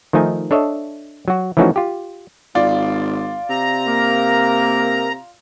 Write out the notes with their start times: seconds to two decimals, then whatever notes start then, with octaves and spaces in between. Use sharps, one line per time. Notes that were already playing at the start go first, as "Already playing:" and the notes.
0.13 D#3 F3 A3 D#4 G#5
0.51 D4 A4 C#5 D#5 E5
1.28 F#3 F#4
1.57 E3 F3 A3 C#4 D#4 F#4
1.76 F4 G4
2.55 G#1 F4 D5
3.50 C3 A#5
3.87 A#3 A#4